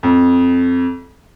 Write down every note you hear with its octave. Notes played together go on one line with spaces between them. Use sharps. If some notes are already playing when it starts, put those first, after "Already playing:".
F2